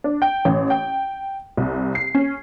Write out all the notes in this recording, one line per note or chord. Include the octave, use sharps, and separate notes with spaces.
D4
G5
A1
G5
C2
C7
C#4